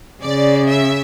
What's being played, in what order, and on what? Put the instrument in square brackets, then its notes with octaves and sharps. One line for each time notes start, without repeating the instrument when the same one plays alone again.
[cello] C#3 [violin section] D5
[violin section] E5